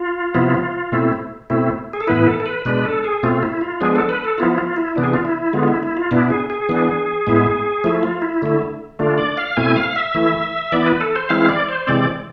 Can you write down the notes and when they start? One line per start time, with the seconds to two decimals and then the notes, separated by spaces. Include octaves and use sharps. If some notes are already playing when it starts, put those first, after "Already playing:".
Already playing: F4
0.34 C3 F3 B3 E4
0.92 B2 A3 C4 E4
1.50 B2 A3 C4 E4
1.93 G#4
2.01 A4
2.07 A2 E3 B3 E4 B4
2.27 A4
2.40 A4
2.46 B4
2.65 B2 G#3 D4 B4
2.85 A4
3.04 G#4
3.23 B2 A3 C4 F4
3.43 E4
3.61 F4
3.81 F3 G#3 B3 D4 G#4
3.96 A4
4.09 B4
4.25 A4
4.38 F3 B3 E4 F4
4.58 F4
4.76 E4
4.96 C3 E3 B3 D4
5.04 G#4
5.14 F4
5.25 E4
5.53 D3 G#3 B3 F4
5.63 F4
5.68 E4
5.83 E4
5.97 F4
6.11 B2 B3 D4 E4
6.30 G#4
6.50 G#4
6.69 E3 B3 D4
7.27 A2 G#3 B3 E4
7.84 F3 A3 E4
8.03 F4
8.22 E4
8.42 D3 A3 E4
8.99 D3 A3 D4 F4
9.18 D5
9.37 F5
9.57 B2 A3 C4 E4 G#5
9.76 F5
9.96 E5
10.14 E3 A3 E4
10.72 E3 B3 E4 D5
10.87 B4
11.01 A4
11.16 C5
11.29 E3 G#3 C4 E4 F5
11.48 D5
11.68 C5
11.87 C3 E3 G#3 C4 D5